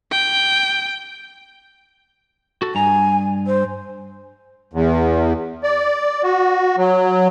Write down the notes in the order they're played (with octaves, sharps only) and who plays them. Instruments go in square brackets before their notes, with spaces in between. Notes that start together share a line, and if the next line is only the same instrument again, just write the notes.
[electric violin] G5
[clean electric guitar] F#4 A4
[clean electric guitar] G2 A#5 [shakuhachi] G#5
[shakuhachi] C5
[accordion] E2
D5
F#4
F#3